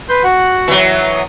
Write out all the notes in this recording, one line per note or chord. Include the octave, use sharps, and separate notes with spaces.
B4 C6 G6
F#4 F#5
E3 F#3
D#6